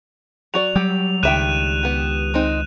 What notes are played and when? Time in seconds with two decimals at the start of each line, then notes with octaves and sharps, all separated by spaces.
0.54 F#3 F#4 D5 F7
0.76 F#3 G3 G4
1.23 C#2 D#3 G3 E5 G5 F#6 D#7 E7
1.83 B3 G4
2.34 G#3 C4 D#4